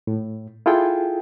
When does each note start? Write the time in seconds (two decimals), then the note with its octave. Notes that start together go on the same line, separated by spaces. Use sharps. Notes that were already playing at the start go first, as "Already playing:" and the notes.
0.07 A2
0.66 E4 F4 G#4 A4 G5